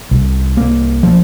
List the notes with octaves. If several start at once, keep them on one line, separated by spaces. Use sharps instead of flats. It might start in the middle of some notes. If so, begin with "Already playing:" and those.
C2
A#3
F3